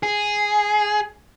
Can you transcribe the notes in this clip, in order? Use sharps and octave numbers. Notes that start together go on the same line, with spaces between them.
G#4